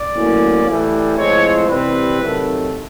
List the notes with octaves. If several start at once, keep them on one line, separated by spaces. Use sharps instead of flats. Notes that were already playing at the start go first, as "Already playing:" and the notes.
Already playing: D5
A2 F#3 A#3 C#4
A2 E3 G3
A2 F3 G#3 C4 C#5
C3 E3 G3 C4 B4
C3 D#3 F#3 A3